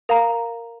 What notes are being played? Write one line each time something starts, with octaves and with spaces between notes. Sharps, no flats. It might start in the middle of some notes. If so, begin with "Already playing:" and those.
A#4 F5 A#5